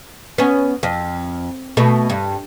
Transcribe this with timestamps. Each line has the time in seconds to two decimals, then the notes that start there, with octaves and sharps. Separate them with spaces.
0.38 B3 C#4
0.83 F2
1.77 B2 A3
2.10 G2